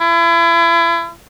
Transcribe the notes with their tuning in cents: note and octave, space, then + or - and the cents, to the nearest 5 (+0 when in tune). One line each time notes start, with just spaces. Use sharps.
E4 +35